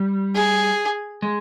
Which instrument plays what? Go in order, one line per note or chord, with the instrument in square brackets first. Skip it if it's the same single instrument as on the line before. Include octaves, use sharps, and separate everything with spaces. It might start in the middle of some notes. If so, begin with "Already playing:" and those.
Already playing: [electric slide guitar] G3
[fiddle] G#4
[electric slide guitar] G#3